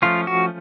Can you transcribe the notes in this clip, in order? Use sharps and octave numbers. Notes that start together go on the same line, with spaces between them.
F3 A3 C#4 F4
F#4